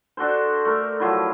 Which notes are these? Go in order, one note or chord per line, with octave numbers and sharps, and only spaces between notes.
D4 F#4 A4 C5
A3 A#4
F3 F#3 E4